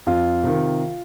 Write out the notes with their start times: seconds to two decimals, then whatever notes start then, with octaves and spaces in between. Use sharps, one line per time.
0.06 F2 F4
0.43 C3 D#3